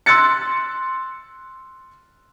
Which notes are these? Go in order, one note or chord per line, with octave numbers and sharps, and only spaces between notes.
C6 E6 F#6 A6 C#7